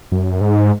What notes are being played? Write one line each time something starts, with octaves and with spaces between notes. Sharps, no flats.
F#2
G#2